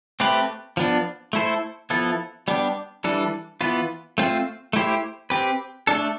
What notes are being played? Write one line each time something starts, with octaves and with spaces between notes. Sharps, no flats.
A3 C4 G4 B4
F3 B3 D4
A3 E4 A4 C5
F3 B3 E4 A4
G3 B3 D4 G4
E3 G3 D4 A4
E3 B3 F4 B4
A3 C4 F4 C5
A3 E4 G4 C5
C4 G4 B4
A3 D4 A4